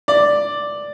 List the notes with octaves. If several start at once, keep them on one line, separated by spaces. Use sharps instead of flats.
D5